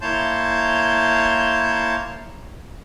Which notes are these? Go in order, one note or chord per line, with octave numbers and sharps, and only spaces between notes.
A#3 E4 C#5 A5 C6 G6